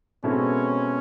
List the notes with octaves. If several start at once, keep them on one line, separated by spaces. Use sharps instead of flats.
B2 G#3 C4 C#4 E4 A4